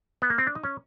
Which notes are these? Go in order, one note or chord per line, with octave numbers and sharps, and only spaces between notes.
B3
A#3
C4
D4
D#4
C#4